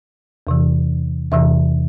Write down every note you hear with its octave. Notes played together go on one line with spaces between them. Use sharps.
E2 C3 E3
E2 C3 E3 E5